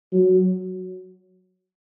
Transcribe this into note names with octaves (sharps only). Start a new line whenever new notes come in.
F#3